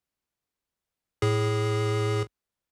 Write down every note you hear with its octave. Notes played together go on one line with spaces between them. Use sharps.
A2 G#4